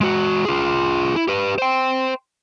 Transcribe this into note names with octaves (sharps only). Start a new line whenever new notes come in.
G#3 F#4
F4 G#4
E4
G4 B4
C5 G5